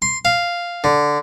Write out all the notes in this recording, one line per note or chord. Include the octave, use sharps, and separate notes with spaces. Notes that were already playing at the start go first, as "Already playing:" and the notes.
C6
F5
D3